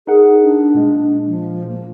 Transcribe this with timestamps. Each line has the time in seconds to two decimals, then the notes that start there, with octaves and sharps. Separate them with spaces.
0.07 D#4 G#4 A#4 F#5
0.42 D4
0.74 A#2 G#3
1.27 F3
1.69 A#3